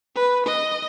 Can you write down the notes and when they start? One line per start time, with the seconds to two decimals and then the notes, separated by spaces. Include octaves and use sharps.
0.16 B4
0.46 D#5